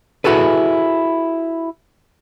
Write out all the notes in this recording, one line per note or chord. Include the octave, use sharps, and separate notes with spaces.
E4 F#4 G#4 A4 B4